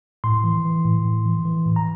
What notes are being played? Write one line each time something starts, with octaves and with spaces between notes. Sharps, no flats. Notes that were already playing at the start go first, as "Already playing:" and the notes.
A2 C6
E3
E3
A2
A2
E3
E3
A2
A#5